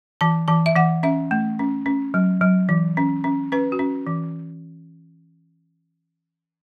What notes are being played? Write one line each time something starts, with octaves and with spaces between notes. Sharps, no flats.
E3 A5
E3 A5
E5
E3 F#5
C#4 E5
A3
C#4
C#4
F#3
F#3
E3
C#4
C#4
C#4 B4
F#4
C#4
E3